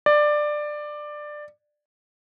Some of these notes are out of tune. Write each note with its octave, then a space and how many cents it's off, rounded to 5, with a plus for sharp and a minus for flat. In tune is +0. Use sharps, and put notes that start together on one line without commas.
D5 +15